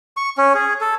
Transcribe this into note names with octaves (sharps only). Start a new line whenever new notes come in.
C#6
C#4
G#4
A4